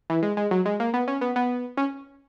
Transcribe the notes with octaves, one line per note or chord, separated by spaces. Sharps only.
E3
G#3
G#3
F#3
G#3
A#3
B3
C#4
B3
B3
C#4